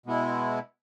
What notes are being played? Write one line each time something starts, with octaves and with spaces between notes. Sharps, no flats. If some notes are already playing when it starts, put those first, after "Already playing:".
B2 G#3 B3 E4